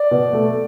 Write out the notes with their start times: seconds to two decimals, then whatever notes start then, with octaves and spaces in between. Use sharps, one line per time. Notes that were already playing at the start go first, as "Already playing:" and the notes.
Already playing: D5
0.11 B2
0.33 A3